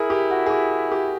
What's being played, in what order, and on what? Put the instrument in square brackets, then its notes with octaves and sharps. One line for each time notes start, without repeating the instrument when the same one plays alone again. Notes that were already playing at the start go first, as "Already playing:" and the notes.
Already playing: [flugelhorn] E4 [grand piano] G#4 A#4
[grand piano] G4
F#4
G#4
G4
G4